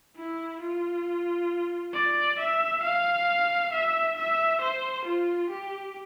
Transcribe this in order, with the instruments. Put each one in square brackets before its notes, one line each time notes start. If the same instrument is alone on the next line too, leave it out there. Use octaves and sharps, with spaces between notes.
[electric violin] E4
F4
D5
E5
F5
E5
E5
C5
F4
G4